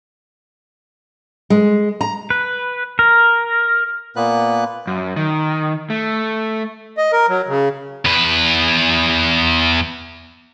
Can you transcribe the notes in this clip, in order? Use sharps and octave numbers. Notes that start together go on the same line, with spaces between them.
G#3
A#5
B4
A#4
A#2 A#3 B3 B4 F#6
F#2
D#3
A3
D#5
A#4
F#3
C#3
E2 B4